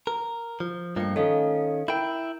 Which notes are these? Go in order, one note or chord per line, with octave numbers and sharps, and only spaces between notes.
A#4
F3
G2 F3 A3 A#3 C#7
D#3 C#4 A4 D#5 F5
E4 A#4 G5 G6